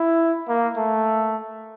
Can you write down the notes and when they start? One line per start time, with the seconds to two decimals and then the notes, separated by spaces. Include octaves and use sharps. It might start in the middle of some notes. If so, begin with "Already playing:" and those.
Already playing: E4
0.49 A#3
0.77 A3